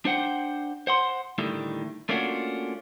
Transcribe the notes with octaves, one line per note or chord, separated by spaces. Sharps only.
D4 C5 F#5 G5
C5 F#5 C6
A2 D3 D#3 G3 A3
A3 A#3 C#4 D4 F4 F#4